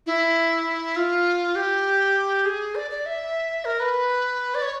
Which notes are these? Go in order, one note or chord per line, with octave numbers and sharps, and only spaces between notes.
E4
F4
G4
G#4
D5
D5
E5
A#4
B4
D5
C#5